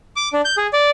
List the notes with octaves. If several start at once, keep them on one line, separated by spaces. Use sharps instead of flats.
D6
D4
G6
G#4
D5